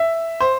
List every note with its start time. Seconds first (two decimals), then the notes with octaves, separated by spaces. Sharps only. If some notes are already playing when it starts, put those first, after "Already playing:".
Already playing: E5
0.40 C5